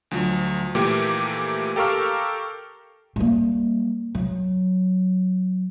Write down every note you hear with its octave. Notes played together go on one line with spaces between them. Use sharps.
D2 F3 F#3
A#2 E3 F3 A3 A#3 G4
G4 A4 A#4 F5 C#6 F6
G3 A#3
F#3